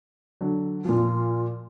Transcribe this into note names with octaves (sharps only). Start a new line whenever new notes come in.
D3 F#3
A#2 F3 F4